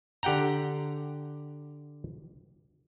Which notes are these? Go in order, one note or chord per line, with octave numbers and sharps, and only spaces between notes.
D3 G4 F#5 G5 A#5